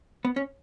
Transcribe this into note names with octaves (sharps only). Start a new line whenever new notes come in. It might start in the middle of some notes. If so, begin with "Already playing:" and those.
B3
C#4